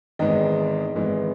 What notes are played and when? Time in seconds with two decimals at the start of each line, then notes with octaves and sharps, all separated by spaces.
0.19 G#1 G#2 E3 G#3 B3 D#5 G5
0.94 G#1 G#2 E3 G#3 B3